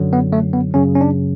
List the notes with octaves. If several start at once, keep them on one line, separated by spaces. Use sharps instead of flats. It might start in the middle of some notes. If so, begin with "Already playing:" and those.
Already playing: F#2 D3 F#3
B3
A3
B3
F#2 C#3 F#3 C#4
C#4
D4